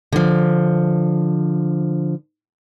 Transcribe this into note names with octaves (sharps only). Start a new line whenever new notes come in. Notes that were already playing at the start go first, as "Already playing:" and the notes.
D3 F3